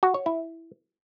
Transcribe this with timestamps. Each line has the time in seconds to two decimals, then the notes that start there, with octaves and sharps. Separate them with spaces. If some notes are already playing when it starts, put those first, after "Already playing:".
0.03 F#4
0.14 C#5
0.26 E4